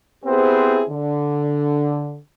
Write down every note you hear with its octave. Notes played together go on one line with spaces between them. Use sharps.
B3 C4 E4 G4 G#4 C5
D3